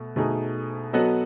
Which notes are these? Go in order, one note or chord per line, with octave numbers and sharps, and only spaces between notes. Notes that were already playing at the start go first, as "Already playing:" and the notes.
Already playing: B2 A3
B2 A3 D#4 G#4
F#3 B3 F#4 A4 D#5